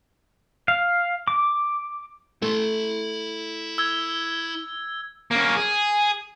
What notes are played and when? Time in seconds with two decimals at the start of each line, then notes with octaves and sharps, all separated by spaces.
0.68 F5
1.28 D6
2.42 A3 E4 C6
3.78 E6 G#6
5.31 A#3 C#4
5.56 G#4